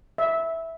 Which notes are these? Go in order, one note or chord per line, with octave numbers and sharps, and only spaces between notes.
E5